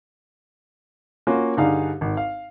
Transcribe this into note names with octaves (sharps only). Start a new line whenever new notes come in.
A#3 C#4 F4 F#4
G2 D3 D#4 G#4 F5
G#1
F5